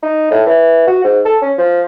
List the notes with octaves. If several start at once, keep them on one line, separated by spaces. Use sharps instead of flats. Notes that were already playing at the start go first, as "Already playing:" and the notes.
D#4
A2
E3
F#4
G#2
A4
C#4
F3